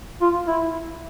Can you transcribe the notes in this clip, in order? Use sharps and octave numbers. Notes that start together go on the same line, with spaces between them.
F4
E4